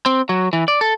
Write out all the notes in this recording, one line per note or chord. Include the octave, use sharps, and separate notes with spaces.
C4
F#3
E3
D5
A4